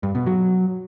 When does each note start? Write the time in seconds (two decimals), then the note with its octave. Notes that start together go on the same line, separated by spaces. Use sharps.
0.03 G2
0.15 B2
0.26 F#3